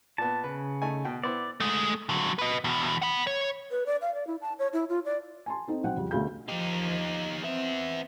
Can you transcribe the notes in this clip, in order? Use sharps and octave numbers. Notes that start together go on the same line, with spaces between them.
A#2 B3 A5
C#3 B4
A3 D#4 G#5
B2 G5
B3 E4 C5 D5
G#3 A3
D3 F#3
B4 D#5
E2 B2
F#5 B5
C#5
B4
D5
F5
D5
E4
A5
C#5
E4
F4
D5
G#5 A5 C6
C4 D#4 A4
B1 C4 F#5 G5
F2 C#3 G3
D2 B2 G#4 F5 G6
F3 D#4 G4
B3 C4 E5